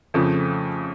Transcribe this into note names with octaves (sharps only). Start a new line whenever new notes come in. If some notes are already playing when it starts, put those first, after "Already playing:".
F2 C#3 F3 A3